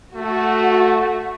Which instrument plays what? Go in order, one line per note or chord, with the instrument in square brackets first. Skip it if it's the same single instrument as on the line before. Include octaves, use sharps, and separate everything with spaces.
[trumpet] A3 [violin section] F#4